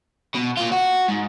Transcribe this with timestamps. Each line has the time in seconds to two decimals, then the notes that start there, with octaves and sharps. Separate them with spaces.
0.35 B2
0.57 A#2 F4
0.71 F#4
1.08 G#2